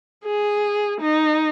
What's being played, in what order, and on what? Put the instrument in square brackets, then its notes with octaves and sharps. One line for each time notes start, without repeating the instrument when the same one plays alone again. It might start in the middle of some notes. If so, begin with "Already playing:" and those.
[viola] G#4
D#4